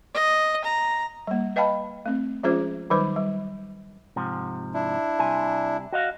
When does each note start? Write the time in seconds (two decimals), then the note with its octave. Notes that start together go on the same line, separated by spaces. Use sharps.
0.14 D#5
0.65 A#5
1.27 G3 A#3
1.56 B4 D#5 F5 G5 A5 B5
2.06 A3 C4
2.43 F3 G#3 C#4 F4 G#4 C5
2.90 D#3 F#3 G3 D#4 B4 C5
3.16 G3
4.16 G#2 C3 F3
4.74 D4 E4
5.19 C3 G3 G#5
5.93 F#4 D#5 F5